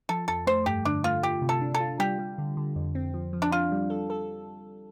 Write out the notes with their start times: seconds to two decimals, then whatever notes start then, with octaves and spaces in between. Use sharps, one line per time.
0.09 F3 A4
0.28 F2 A4
0.47 A3 C5
0.66 G2 G4
0.85 D3 D4
1.04 A3 F4
1.23 F4 G4
1.42 C3
1.49 A4
1.61 D4
1.74 A4
1.80 F4
1.99 G3 G4
2.19 G3
2.38 D3
2.57 D3
2.76 F2
2.95 C4
3.14 F3
3.33 F3
3.42 D4
3.52 D4 F4
3.72 G3
3.90 A4
4.10 A4